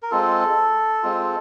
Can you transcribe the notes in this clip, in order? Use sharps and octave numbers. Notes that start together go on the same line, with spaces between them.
A#4
G#3 C4 F4 A4
G#3 C4 F4